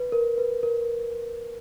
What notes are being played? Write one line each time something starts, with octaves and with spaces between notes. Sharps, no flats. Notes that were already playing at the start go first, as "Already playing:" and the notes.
Already playing: B4
A#4
B4
A#4